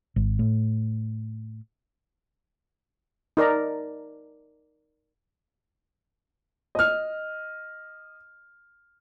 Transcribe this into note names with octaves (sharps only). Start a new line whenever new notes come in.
G#1
A2
D#4 A#4 D5 A#5
D#5 F6